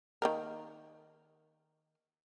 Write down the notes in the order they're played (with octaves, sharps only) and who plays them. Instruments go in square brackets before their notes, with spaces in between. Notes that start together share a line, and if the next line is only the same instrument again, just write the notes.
[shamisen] D#3 A#3 A#4